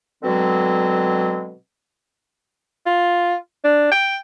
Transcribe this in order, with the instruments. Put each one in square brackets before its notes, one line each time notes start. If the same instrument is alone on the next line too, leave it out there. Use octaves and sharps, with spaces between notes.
[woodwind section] B2 D3 F#3 G#3 C4
[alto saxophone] F4
D4
G5